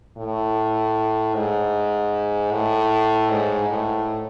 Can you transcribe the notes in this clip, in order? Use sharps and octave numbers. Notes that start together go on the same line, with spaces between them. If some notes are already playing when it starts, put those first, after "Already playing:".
A2
G#2
A2
G#2
A2